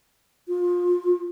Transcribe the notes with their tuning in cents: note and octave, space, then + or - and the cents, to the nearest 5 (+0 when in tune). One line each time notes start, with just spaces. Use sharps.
F4 +25